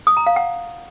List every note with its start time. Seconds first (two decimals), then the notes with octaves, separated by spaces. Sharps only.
0.07 D#6
0.17 A#5
0.27 F5
0.36 F#5